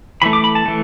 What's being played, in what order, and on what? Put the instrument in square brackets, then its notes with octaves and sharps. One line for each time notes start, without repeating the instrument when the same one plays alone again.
[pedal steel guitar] E3 A3 B5
D6
B5
A5
E3 A3